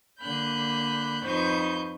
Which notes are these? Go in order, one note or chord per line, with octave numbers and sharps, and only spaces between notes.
D3 A#3 B5 F#6 G6
F2 D#4 B4 C5 C#6 G6